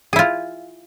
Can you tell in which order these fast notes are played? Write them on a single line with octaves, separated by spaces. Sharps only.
G#4 E4 F4